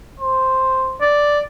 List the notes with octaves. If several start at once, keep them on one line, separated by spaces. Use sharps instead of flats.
C5
D5